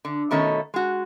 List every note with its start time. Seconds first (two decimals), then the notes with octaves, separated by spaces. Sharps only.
0.05 D3
0.31 B2 D#3 A3 C#4 D#5
0.74 G#3 F#4